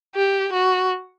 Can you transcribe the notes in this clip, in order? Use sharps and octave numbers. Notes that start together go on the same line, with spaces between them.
G4
F#4